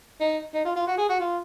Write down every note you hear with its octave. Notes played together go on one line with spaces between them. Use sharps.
D#4
D#4
F4
F4
F#4
G#4
F#4
F4